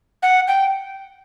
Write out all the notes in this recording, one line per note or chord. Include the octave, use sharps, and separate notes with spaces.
F#5
G5